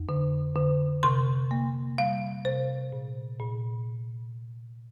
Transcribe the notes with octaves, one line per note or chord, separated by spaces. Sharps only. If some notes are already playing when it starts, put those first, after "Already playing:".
Already playing: F2
D3
D3
C3 C6
A#3
G3 F5
C3 C5
A#2
A#2